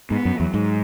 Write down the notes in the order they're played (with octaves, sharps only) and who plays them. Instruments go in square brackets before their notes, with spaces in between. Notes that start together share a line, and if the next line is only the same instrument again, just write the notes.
[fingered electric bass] G#2 [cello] B3
[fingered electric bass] F#2
[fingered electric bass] E2 [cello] F#3
[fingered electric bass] G#2